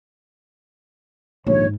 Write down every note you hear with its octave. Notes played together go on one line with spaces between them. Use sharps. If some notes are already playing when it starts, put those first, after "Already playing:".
A#1 D#2 G#2 C#5